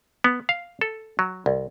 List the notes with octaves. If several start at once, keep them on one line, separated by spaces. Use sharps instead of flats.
B3
F5
A4
F#3
C2